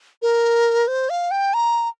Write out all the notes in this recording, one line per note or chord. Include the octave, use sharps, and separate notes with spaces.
A#4
C5
F5
G5
A#5